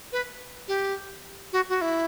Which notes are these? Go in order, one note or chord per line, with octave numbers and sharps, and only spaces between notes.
B4
G4
F#4
F#4
E4